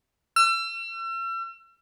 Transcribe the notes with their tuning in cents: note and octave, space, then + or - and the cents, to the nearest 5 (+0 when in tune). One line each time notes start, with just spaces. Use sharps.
E6 +40